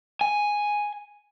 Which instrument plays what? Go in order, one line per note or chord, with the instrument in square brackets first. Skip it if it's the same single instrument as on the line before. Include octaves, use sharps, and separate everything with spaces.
[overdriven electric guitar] G#5